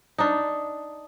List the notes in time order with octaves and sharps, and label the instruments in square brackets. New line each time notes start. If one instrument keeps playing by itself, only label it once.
[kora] D4 D#4